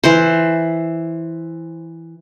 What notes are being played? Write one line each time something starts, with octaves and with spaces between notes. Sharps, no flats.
E3 C5